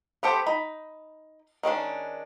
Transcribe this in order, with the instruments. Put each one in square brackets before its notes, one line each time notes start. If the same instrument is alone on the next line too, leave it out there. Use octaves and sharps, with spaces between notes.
[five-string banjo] B3 G4 A4 C5
D#4 B5
D#3 G#3 C#4 D4